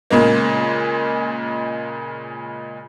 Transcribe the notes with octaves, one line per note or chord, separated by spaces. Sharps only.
A#2 C#3 G#3 A#3